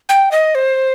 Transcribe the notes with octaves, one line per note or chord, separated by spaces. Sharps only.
G5
D#5
C5